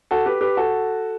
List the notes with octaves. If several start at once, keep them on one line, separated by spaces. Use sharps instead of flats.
F#4 A4
G4 B4
G4 B4
F#4 A4